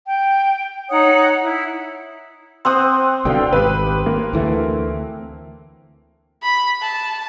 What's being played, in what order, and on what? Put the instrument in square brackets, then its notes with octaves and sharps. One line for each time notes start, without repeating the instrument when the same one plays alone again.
[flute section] G5
D#4 C#5 F#5 D#6
E4
[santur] C4 F#5 D#6 [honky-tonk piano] C5
[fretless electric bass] C2 B2 D3 [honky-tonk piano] F5 G5
[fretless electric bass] G#1 [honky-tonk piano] G4 B4
[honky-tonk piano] A#3
[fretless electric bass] D2 E3 A3
[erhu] B5
A5